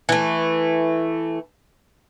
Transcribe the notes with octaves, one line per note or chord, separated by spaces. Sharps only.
E3 A3